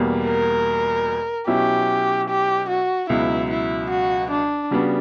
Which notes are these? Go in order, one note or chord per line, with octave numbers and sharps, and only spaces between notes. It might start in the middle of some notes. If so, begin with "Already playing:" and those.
Already playing: E2 B2 G3 A#3
A#4
B2 F#3 C#4 E4 G4
G4
F#4
C#2 B2 F#3 E4
E4
F#4
D4
C#3 G3 B3 D4 F#4